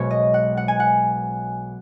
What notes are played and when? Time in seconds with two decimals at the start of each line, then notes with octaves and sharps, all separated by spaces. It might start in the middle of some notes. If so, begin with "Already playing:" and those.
Already playing: B1 B2 G#3 C#5
0.11 D#5
0.34 F#5
0.57 F#5
0.68 G#5
0.80 F#5